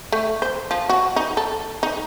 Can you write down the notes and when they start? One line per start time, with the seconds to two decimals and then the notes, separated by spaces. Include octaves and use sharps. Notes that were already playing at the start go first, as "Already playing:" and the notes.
0.12 A3
0.42 C5
0.71 F3
0.89 F#4
1.16 D#4
1.37 A4
1.83 D#4